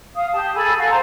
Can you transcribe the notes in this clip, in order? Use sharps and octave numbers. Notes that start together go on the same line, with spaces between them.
F5 D#6
G4 A5 D#6
G#4 A4 B5 E6
F#4 A4 F5 G#5
C5 A#5